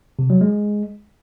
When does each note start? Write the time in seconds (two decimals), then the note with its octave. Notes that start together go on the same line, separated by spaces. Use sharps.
0.19 C3
0.30 F#3
0.41 G#3